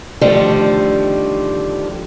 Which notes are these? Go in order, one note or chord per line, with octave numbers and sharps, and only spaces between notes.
D3 D#3 F3 G3 A3